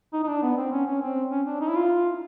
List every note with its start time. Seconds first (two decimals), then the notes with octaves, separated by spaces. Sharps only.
0.13 D#4
0.23 D#4
0.28 D4
0.42 B3
0.57 C4
0.72 C#4
0.87 C#4
1.02 C4
1.31 C#4
1.47 D4
1.61 D#4
1.69 E4
1.76 F4